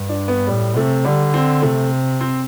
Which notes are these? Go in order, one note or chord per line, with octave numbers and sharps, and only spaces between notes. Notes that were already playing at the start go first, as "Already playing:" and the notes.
Already playing: G2
D4
B3
A2 G3
C3 A3
D3 G3
C4
C3 A3
C4